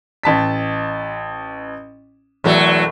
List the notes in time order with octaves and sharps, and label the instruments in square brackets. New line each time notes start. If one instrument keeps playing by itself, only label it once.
[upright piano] A1 A5 B6
[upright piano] E1 [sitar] E2 F#3 A3